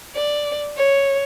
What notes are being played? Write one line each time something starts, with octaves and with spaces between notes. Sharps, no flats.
D5
C#5